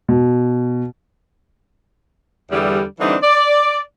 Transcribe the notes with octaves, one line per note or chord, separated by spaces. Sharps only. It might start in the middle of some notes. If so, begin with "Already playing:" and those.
B2
E2 D3 G3
D3 E3 G3 C4 D4 D#4
D5